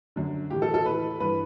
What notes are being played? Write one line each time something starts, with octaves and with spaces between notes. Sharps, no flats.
F#2 D3
A2 E3 G4
A4
A4
A2 E3 B4
G2 E3 B4